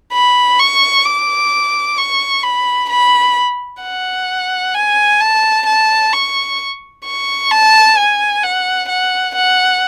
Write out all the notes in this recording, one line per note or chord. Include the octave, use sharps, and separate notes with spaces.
B5
C#6
D6
C#6
B5
B5
F#5
G#5
A5
A5
C#6
C#6
A5
G#5
F#5
F#5
F#5